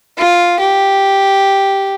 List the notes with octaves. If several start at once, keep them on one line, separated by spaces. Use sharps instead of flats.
F4
G4